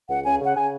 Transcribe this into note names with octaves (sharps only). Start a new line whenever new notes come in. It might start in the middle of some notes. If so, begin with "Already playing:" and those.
C#2 F#5
C#3 G#5
C#3 F#5
C#3 G#5